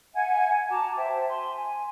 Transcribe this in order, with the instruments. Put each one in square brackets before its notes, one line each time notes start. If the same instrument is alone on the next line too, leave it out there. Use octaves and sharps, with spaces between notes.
[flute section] E5 F#5 G#5 G#6
F#4 A5 A#5 D6
C5 E5 G5 A5
G#5 C6
G#5